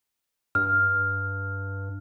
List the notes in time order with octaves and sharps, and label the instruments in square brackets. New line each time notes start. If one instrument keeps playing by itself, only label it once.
[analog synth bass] G2 [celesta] F6